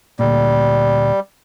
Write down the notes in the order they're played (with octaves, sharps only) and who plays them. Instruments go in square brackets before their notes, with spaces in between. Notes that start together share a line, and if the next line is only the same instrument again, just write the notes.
[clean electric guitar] D2 A#2 [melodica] G3